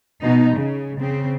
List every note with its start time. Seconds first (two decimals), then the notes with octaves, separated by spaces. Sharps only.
0.22 B2 D#4
0.55 C#3
1.00 C#3 C4